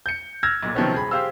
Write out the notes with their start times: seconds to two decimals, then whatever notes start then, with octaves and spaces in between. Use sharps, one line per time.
0.06 G6 C#7
0.43 E6 F6 G#6 A#6
0.63 B1 A#2
0.75 C3 D#3 F3 F#3 B3 C#4
0.92 D#1 G#4 B5
1.11 G4 G#4 C5 F5 E6